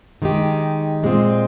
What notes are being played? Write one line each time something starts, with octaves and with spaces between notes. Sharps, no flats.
D#3 G#3 D#4 G4
A#2 G#3 C4 F4